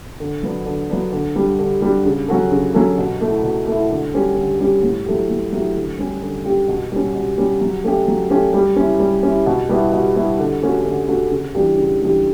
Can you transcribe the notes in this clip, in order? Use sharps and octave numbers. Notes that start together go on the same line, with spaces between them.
D3
F#3 B3 D4
D3
F#3 B3 D4
D3
G3 D4
D3
G3 D4
C#3
F#3 C#4 F#4 A4
C#3
F#3 C#4 F#4 A4
B2
A3 E4
B2
A3 E4
D3
G3 C#4 G4
D3
G3 C#4 G4
A2
F#3 A3 E4 G4
A2
F#3 A3 E4 G4
D3
G3 C#4 G4
D3
G3 C#4 G4
B2
G3 C#4
B2
G3 C#4
F#3
A3 C#4 G4
F#3
A3 C#4 G4
G3
C#4 E4
G3
C#4 E4
B2
G3 B3 E4
B2
G3 B3 E4
D3
A3 C#4 F#4 A4
D3
A3 C#4 F#4 A4
C#3
E3 G3 D4 G4
C#3
E3 G3 D4 G4